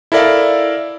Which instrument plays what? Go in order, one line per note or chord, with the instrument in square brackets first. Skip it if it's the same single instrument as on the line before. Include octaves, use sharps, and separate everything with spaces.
[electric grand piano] E4 A4 A#4 D5 E5 F5